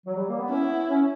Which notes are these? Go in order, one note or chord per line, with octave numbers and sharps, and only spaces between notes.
F#3
G3
A#3
B3
C#4 E4
B3
C#4